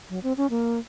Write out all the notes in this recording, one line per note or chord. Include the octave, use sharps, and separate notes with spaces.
F#3
C4
C#4
A#3